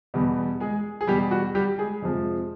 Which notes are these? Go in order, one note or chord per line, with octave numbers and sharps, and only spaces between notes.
E2 B2 G3
G#3 G#4
G#4
E2 B2 G3 G4
F#4
G3 G4
G#3 G#4
F2 C3 F3 G#3